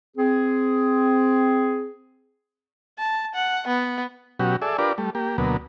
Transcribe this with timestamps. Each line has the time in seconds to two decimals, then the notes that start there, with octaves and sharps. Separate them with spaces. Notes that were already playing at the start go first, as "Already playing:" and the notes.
0.17 C4 G#4
2.99 A5
3.35 F#5
3.68 B3
4.39 B2 F#3 C#4 F#4 G4
4.62 G#4 A4 D5 E5
4.78 D4 F4 G4 A#4 B4 D5
4.98 G3 A3
5.15 A#3 G4
5.38 D2 B2 F#3 A#3 B3